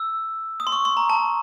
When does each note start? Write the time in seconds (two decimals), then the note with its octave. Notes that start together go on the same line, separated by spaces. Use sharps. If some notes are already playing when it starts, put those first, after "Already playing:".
Already playing: E6
0.60 D#6
0.67 C6
0.72 C#6
0.85 C6
0.97 A#5
1.10 A5